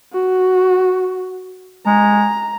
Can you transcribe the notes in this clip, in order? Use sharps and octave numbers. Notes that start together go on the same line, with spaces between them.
F#4
G#3 A#5